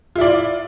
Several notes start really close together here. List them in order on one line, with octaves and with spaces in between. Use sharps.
F4 E4 D5